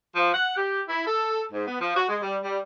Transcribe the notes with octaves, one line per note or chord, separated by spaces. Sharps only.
F3
F#5
G4
E4
A4
G#2
B3
F3
F#4
G#3
G3
G3